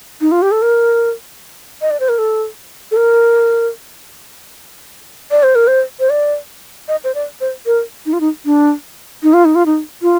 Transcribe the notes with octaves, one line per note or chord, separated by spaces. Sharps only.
D#4
F4
G4
A4
A#4
D#5
D5
C5
A#4
A4
A4
A#4
D5
C5
A#4
C5
C5
D5
D#5
C5
D5
C5
A#4
D#4
F4
D#4
D4
D#4
F4
D#4
F4
D#4
F4